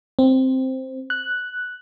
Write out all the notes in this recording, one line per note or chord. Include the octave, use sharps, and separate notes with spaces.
C4
F#6